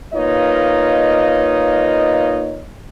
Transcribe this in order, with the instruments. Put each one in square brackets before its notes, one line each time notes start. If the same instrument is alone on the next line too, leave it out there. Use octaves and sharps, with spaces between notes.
[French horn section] A#3 D#4 F4 B4 C#5 D#5